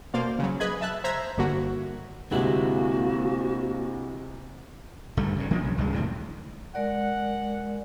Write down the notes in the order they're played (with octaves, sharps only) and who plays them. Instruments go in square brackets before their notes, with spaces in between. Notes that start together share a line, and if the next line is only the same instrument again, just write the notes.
[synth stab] B2 A#3 C5 D5 F5
C#3 F#3
G#4 B4 D#5 B5 F#6 G#6
E5 A5 F#6
C5 E5 A#5 G#6 B6
G1 G2 D3 A#3 F#4
[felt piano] D2 G#2 C3 [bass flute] A#3 [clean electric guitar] C4 E4 F#5 [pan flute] F#4
[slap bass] G1 G2 D3 A3
G2 C#3
F3 A#3 D4
B1 C#3
C#2 G2 G#3
D#2 A2 C3
[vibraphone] G#3 A#4 D5 [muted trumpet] F#5